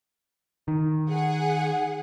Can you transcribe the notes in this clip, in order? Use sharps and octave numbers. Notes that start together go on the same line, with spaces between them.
D#3
G#4 F#5